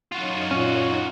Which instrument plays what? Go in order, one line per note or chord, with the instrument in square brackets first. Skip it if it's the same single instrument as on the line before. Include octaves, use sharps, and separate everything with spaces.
[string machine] F#2 D#4 C#5 [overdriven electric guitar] F4 F#4
[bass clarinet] A#2 [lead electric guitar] C#4